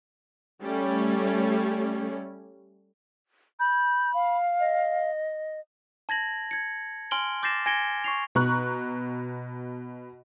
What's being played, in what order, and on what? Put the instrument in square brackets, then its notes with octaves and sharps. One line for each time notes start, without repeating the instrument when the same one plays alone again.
[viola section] G3 A3 C#4
[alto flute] B5 [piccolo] G6
[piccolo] F5
[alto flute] D#5
[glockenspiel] A5 G#6 A#6 F#7
G#6 C#7
G#5 C6 F6 D7 F#7 G7
D6 G6 A6 A#6 C7 E7
G#5 G#6 A#6 C#7 D7 G7
C#6 C7 F7
[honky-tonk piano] B2 A#5 C#6 F#6